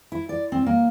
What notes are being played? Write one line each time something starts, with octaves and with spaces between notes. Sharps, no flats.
E4
D5
C4
A#3